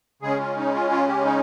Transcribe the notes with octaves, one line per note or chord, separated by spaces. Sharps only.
C#3 G#3 C#4 G#4
F4
D#4
F4
F4
G4
D#4